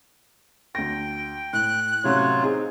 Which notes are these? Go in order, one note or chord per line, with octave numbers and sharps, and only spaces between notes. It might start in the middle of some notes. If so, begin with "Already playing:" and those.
D2 G5 A#6
A2 F#6
A2 C3 F#3 C#4 F4 C#5
C4 D#4 G#4